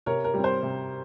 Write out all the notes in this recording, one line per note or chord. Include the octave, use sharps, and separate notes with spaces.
C3 A#4 C#5
A#4
G3 C4
C5
C3